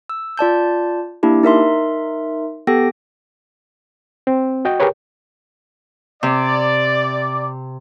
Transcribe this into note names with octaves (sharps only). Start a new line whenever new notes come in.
E6
F4 D5 A5 G6
A#3 D4 E4 G4
D#4 A#4 E5 C6
B3 G4 A4 G5 A#6
C4
F#4 D#5 G5
G4 G#4 A#4 B4 C#5
C3 D5